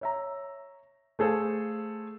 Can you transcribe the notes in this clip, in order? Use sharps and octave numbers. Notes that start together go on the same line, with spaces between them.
C#5 E5 A#5
A3 G#4 A4 C5 F5